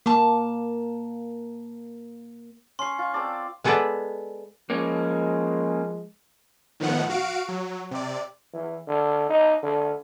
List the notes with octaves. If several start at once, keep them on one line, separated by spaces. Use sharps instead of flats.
A#3 A5 D6
C#4 C6 C#6 C7
F4
C4 A4 D5
G#3 B3 G#4 A4 B4 D5
F3 G#3 A#3 C#4
A2 D#3 F3 B3 F#5
F#4 F5 D7
F#3
C3 D5
E3
D3
D#4
D3